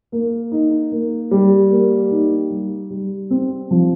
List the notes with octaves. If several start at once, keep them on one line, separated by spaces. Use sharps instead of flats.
A#3
D#4
A#3
G3
A#3
D#4
G3
G3
C4
F3